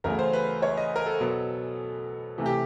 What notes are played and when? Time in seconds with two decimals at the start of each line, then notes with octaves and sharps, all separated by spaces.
0.04 E2 C#3 F#3 A3 A#4
0.19 C5
0.33 B4
0.62 C#5
0.77 D#5
0.96 A#4
1.06 A4
1.21 B2 F#3 B3
2.38 C3 E3 A3
2.46 G4